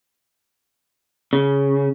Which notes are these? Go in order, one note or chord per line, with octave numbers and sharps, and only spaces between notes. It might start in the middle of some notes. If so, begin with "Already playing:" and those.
C#3